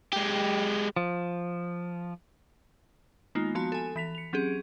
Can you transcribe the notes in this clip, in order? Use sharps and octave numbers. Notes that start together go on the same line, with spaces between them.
G#3 G4
F3
D#3 G#3 A#3 B3 D#4 F4
F3 B3 F#4 A5
A4 G#5
E3 B6 F7
C#7 F7
F#3 C4 C#4 G4 G#4